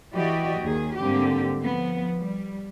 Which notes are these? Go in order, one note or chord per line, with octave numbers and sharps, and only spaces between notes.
E3 F#4 G4 D5 D#5
D#2 D#3 G#4
G#2 D3 G3 A#3 C4 G4
F3 B3
G3